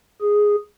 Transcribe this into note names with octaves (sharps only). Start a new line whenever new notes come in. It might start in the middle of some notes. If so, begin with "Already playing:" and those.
G#4